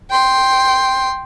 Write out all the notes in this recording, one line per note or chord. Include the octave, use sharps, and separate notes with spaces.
G5 C6